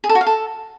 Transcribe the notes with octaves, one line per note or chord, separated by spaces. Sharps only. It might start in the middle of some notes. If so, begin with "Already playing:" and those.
G#4
A4
F#4
F5
A4